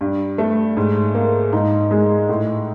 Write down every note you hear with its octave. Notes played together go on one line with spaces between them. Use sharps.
G2
A3
G#2
A#3
G#2 D#4
G#3
A2